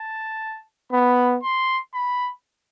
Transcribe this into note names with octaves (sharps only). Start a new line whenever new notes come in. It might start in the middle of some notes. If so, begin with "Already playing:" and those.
Already playing: A5
B3 B5
C6
B5